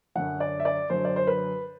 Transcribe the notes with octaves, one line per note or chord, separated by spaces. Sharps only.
F#2 D3 F#3 F#5
D5
E5
D5
F#2 D3 F#3 C5
D5
C5
B4